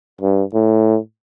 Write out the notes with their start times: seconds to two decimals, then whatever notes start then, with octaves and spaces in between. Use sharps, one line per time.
0.21 G2
0.54 A2